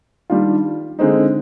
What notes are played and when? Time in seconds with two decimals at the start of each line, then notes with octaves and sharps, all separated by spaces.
0.30 D#3 G3 D4 F4
0.99 D3 G#3 C4 D#4